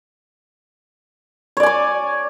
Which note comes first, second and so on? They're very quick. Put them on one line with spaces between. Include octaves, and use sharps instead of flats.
C#5 D5 G#5 D6